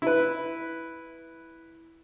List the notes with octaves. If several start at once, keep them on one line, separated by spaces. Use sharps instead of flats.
E4 B4